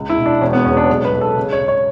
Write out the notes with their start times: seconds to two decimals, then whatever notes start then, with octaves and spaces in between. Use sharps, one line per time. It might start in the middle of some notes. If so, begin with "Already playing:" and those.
Already playing: C#2
0.10 E4
0.17 B2
0.26 D4
0.41 E1 C#4
0.53 B3
0.65 E2 C#4
0.77 D4
0.89 B1
1.05 B4
1.13 B1
1.21 A4
1.37 C#3
1.52 C#5
1.61 C#3
1.68 C#5